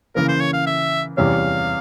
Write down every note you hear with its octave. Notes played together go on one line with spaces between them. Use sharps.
C#3 E3 A#3 A#4
C5
C#5
F5
E5
E2 C3 E3 G3 C#4 F5